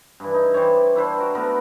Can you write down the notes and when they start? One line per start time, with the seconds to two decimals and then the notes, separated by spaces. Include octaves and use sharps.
0.20 G2 E3
0.34 D#4
0.54 E3 G4 C5 C#5
0.95 D4 E4 B4 C5
1.19 F#4 A#4
1.35 A3 B3 A#4 B4